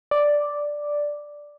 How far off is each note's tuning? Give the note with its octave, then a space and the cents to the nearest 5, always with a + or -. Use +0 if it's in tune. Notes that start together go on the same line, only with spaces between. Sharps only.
D5 +0